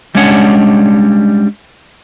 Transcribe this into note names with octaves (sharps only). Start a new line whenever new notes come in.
G3 G#3 C#4 D4 C#5 F#5